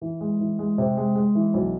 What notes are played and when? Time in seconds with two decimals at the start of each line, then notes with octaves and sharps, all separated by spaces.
0.01 E3
0.21 G#3
0.40 E3
0.59 G#3
0.78 C3
0.97 G#3
1.15 G#3
1.35 E3
1.54 B1